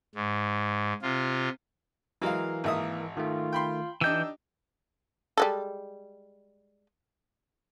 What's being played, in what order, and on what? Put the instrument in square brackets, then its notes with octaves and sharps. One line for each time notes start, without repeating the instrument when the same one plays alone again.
[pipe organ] G#2
C3 F4
[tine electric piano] E3 A#4 [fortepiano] F#3 G#3 F5
[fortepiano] G#1 E5 D#6 [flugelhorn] A#3
[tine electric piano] D#3 A3 [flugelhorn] F4
[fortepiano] G5 B5 C6
[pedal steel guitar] E3 G6 [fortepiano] D4 D#4 G4 [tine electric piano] E6
[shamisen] G3 G#3 A4